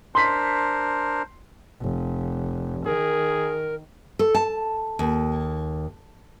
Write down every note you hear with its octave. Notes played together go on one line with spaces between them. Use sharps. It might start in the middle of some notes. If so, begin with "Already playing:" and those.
D4 A#4 C5 C6 B6
F1
D#3 G#4 A#4
A4
A5
D#2